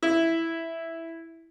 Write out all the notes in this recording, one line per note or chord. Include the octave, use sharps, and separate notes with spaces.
E4